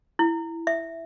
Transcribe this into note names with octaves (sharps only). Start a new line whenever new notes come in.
E4
E5